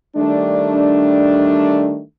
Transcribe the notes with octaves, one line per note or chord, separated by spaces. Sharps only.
D#3 G3 A3 D4